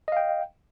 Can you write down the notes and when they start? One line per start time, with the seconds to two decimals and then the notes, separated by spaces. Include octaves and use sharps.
0.08 D#5
0.12 F5
0.17 G5